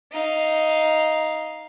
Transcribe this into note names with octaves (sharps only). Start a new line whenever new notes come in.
D#4 F5